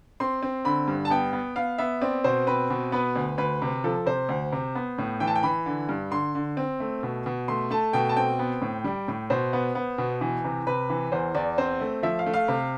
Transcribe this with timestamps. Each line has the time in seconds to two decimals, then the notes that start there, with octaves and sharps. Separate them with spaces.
0.20 C4 C6
0.42 C4
0.65 D3 B5
0.88 G2
1.05 A5
1.10 B3 G5
1.33 B3
1.56 B3 F5
1.78 B3 E5
2.01 C4 D5
2.24 B2 C5
2.47 C4 B4
2.70 B2
2.92 B3 B4
3.16 D2
3.38 D2 B4
3.62 C3
3.84 F3 A4
4.06 C3 C5
4.29 D2
4.52 C3
4.75 B3
4.98 A2
5.20 E3 G5
5.27 A5
5.35 G5
5.43 E3 B5
5.66 D3
5.89 G2
6.11 D3 C6
6.35 D3
6.57 C4
6.80 A3
7.03 B2
7.26 B2
7.48 A3 C6
7.71 A3 A5
7.93 B2 G5
8.09 A5
8.16 C4 G5
8.39 B3
8.62 A2
8.84 G3
9.08 A2
9.30 B2 C5
9.53 B3
9.75 B3
9.98 B2
10.21 E3
10.44 C3
10.67 C3 B4
10.90 E3
11.12 E2 C5
11.35 E2 D5
11.58 C4 C5
11.80 A3
12.03 F3 E5
12.19 F5
12.26 A3
12.34 F5
12.48 C3